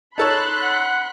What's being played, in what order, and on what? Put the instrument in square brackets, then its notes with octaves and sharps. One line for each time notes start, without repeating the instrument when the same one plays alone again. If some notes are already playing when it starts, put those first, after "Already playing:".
[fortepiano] D#4 A4 C#5 [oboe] A5 [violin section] B5 C6 F#6
[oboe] F#5